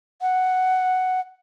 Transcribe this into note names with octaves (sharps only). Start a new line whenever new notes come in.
F#5